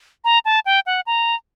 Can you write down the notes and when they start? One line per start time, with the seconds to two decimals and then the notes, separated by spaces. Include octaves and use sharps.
0.25 A#5
0.45 A5
0.66 G5
0.86 F#5
1.07 A#5